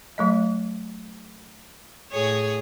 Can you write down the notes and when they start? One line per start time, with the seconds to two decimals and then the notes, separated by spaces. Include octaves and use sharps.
0.18 F#3 A3 D#5
2.12 A2 G#4 C#5